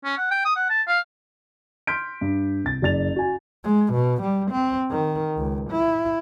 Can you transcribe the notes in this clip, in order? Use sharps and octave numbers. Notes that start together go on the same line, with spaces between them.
C#4
F#5
G5
D#6
F#5
A5
F5
C6 F6 G6 B6 D7
G2
C2 A6
F#1 D5 A6 F7
F#4 G#5
G#3
B2
G3
C4
D#3
C#2
E4